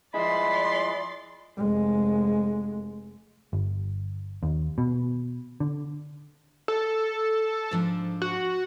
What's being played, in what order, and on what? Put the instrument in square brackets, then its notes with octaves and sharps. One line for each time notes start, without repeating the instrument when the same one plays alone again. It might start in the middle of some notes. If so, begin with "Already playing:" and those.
[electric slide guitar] F3 E4 [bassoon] G#3 [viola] D5 C6 [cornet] B5
[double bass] F1 G#3
[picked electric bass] G1
D#2
B2
D3
[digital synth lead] A4
[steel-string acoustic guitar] G#2 F3 D4
[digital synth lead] F#4